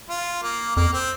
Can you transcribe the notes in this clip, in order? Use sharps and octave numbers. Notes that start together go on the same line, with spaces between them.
F4
A#3
F2 A#3
C4